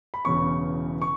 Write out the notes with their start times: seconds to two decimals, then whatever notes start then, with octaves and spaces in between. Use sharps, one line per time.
0.14 B5
0.25 E1 E2 C#3 E3 C#4 C#6
1.02 C#6